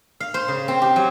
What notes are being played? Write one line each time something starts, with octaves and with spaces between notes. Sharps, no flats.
F5
C5
C#3
C4
G4
F#3